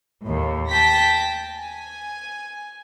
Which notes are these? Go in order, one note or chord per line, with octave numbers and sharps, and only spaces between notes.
D#2 A2
G5 A5 A#6 B6
G#5